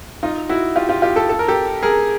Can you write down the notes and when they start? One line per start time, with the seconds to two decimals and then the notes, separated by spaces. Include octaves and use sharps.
0.23 D#4 F4
0.49 E4 F#4
0.76 F4 G4
0.89 F4 G4
1.02 F4 G4
1.16 G4 A4
1.29 A4
1.39 A#4
1.48 G4 A4
1.83 G#4 A#4